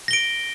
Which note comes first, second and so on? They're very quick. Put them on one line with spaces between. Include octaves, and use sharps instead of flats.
A#6 G7 D7